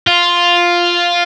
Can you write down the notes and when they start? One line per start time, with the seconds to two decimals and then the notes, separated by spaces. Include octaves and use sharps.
0.07 F4